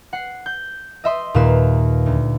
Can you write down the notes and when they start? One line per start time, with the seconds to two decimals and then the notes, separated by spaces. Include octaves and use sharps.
0.13 F#5 C7
0.46 G6
1.04 D#5 E5 C6 D#6
1.34 D#2 A#2 G4 B4 F5 E7
2.06 D2